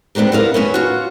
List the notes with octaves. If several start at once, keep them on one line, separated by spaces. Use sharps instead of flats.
B3 C4 D4 G4 A#4
B3 E4 A#4 F5
B3 C#4 E4
F4 F#4